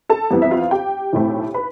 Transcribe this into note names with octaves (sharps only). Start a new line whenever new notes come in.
A4 A5
F2 E3 G3 B3
E5
F4 F5
G4 G5
B1 A2 E3 A3 C4
B4 B5